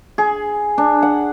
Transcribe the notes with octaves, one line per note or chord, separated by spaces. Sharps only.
G#4
D4
F#5